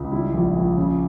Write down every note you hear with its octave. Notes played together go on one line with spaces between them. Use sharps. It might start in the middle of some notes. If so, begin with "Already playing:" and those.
Already playing: C#2
G3 E4
A#1
A#1
C#3